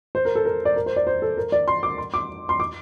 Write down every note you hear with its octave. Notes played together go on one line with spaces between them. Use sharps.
C5
A#4
A4
A#4
D5
A#4
C5
D5
C5
A4
A#4
D5
C6
D6
C6
D6
C6
D6